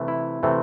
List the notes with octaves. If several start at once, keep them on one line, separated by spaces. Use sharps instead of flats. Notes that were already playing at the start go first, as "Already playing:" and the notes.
Already playing: C3 E3 A3
E4
C3 E3 A3 C4